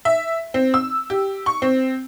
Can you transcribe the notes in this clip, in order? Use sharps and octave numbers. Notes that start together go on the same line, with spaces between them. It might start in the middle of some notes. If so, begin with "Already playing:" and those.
E5
C4
E6
G4
C#6
C4